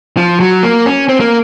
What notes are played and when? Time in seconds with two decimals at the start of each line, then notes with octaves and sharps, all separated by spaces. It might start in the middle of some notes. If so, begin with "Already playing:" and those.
0.17 F3
0.40 F#3
0.63 A#3
0.86 C#4
1.09 C4
1.20 A#3